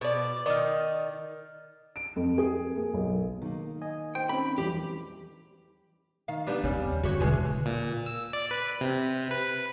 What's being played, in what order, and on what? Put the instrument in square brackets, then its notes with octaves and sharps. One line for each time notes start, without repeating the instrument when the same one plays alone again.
[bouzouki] B2 D5
[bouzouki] D#3 D#4 [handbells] D5 F6
[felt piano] D7
F2
G#4
A#3
B1
[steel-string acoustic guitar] D#3 A#3
[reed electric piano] D#5 G#5
[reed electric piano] C5 [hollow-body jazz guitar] G5
[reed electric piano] C4 C#4 D#4 [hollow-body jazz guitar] B5
[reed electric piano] E2 E3 G3 [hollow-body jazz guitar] G4
[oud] D#3 F5
G3 B3 D4
[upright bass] E2 C4 [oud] C#3 G3
[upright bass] D#2
[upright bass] F#2 D3 [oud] F#4 G4 C#5
[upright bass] D#1 D3 [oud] B2 E3 G#3
[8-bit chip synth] A#2
E6
D5
B4
C3
B4